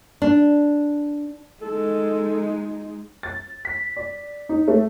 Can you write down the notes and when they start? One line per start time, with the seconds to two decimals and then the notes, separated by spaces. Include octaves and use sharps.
0.22 D4
1.62 G#3 D#4 A4
3.23 A6
3.65 B6
3.97 D5
4.49 D#4
4.68 A3